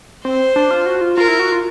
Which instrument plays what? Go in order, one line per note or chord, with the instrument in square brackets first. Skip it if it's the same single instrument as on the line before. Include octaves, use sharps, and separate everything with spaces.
[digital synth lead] C4 [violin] C5
[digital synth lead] D4
F4
F#4
F4
[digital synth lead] F4 [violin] A#4
[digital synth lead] E4
F#4
F4